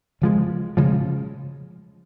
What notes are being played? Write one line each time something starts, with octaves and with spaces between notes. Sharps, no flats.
C#3 F3 G#3
C#3 F3 G#3